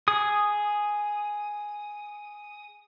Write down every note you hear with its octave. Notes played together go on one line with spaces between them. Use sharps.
G#4 D#6